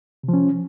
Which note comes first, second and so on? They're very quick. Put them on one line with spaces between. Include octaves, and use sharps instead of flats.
C3 F3 C#4